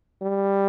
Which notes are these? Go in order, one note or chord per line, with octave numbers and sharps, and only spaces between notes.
G3